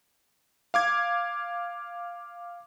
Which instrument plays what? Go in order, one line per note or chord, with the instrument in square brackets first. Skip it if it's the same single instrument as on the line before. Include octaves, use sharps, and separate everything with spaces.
[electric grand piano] F5 D6 G#6